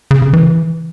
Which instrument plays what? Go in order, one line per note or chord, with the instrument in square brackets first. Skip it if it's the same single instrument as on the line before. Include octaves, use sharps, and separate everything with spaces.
[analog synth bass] C#3
C#3
E3